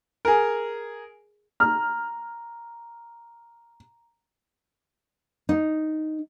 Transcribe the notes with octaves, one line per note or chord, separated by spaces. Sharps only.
G#4 A#4
A#5 F6
D#4